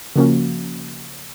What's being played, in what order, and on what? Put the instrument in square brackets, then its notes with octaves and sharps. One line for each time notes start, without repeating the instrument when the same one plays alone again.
[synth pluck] C#3 F3 A#3 C#4 F#4